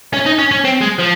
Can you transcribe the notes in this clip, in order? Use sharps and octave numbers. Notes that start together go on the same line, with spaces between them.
C#4
D#4
C#4
C#4
C4
G#3
F3